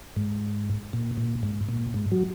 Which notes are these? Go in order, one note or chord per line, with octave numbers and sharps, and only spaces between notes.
G#2
A#2
A#2
G#2
A#2
G#2
F#3